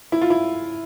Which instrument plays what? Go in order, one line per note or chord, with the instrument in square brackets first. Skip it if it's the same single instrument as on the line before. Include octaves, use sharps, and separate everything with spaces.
[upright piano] E4
F4
E4